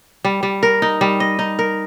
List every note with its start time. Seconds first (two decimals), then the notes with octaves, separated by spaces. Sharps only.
0.24 G3
0.43 G3
0.63 A#4
0.82 D#4
1.01 G3
1.20 D#5
1.39 D#4
1.59 A#4